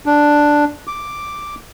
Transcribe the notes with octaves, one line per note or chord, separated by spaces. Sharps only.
D4
D6